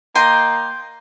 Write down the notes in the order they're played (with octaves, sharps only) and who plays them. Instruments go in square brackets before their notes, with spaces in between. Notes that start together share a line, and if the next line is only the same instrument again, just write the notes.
[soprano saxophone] A#3 [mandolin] D#5 G5 C6